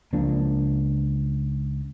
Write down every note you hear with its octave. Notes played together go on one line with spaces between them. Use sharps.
C#2 F3 A#3 D4